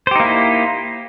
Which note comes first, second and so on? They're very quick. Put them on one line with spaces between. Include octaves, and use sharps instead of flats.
C5 G4 D#4 A#3 E4